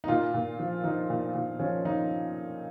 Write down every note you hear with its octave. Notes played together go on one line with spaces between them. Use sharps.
D#4
A#2 F4
A#2
F3
F3 D#4
A#2
A#2
F3 C#4
F3 D#4